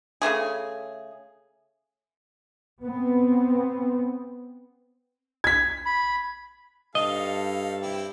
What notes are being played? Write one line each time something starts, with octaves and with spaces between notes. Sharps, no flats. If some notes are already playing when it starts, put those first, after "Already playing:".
C#3 F3 A3 G#4
B3 C4
G#6 B6
B5
G2 D#4 A4 D#5 F5
C4 E4 G4